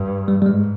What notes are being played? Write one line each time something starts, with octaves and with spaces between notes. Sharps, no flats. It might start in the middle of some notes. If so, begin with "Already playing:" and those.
Already playing: G2
G3
G3
G#2 G#3